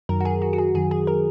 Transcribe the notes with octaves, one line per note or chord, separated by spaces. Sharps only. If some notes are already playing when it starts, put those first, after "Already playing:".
F#2 D#3 F#3 A#4
F#4
G#4
F#4
F#4
G#4
F#2 D#3 F#3 G#4
G#4
A#4